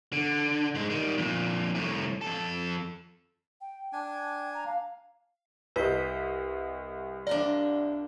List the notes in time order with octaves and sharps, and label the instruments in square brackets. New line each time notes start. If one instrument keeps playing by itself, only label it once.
[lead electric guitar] D3
G#2 G#3
D#3 G3
F2 A#2
C2 A2
F2 A4
[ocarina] G5
[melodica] D4 G#5
[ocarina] A#5
F5
[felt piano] C2 D#5 [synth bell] B4 B6
[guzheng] D4 F4 A#4 [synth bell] D5